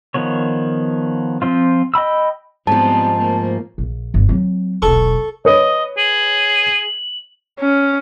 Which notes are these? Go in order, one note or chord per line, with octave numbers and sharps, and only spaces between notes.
D#3 F3 B3 C#5
F3 C4 F4
D#5 G5 B5 E6
G#2 F3 G3 B3 C4 A5
A3 A#3
A#1
G1 D3
F#3 C4
E1 B1 A4 C#6
B4 C#5 D#5
G#4 F#7
C#4